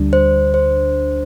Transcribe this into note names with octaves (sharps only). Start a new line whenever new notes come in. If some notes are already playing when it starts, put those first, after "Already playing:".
Already playing: D2 D3 G3 D4
C5
C5